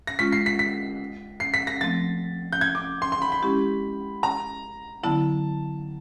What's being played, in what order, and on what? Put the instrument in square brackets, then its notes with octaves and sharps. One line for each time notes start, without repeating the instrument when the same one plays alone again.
[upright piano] A#6
[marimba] G#3 C#4 F4 [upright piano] B6
[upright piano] C7
B6
B6
C7
B6
A#6
[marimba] F3 A3 C4 [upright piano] A6
[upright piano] G6
G#6
D6
C6
C6
B5
B5
[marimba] G#3 C#4 E4 G4
[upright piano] A#5
[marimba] D3 F#3 B3 E4 [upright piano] A5